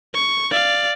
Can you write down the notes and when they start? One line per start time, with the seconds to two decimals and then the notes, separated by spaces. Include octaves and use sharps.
0.14 C#6
0.51 D5 F5